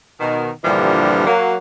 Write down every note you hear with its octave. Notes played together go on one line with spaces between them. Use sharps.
B2 D#3
G2 A#2 D3 E3 F3 G3
F#3 A#3